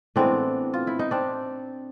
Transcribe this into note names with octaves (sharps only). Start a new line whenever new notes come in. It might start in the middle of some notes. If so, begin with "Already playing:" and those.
A2 E3 G#3 B3 C4 D4
F4
E4
D#4
C4 D4